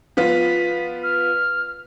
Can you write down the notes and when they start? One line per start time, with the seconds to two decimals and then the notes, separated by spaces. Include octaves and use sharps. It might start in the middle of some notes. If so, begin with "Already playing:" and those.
0.17 F3 B3 F4 B6
1.03 F6